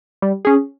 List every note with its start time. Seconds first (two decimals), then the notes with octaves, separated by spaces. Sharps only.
0.22 G3
0.45 C#4 G#4